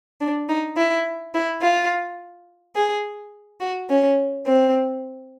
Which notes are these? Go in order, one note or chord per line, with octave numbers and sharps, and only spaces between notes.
D4
D#4
E4
E4
F4
G#4
F#4
C#4
C4